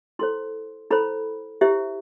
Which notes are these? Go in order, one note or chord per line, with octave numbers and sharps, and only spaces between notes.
E4 A4 C5 C6
E4 A4 C5 B5
E4 G4 C5 E5